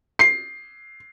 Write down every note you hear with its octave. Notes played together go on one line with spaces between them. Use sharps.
C7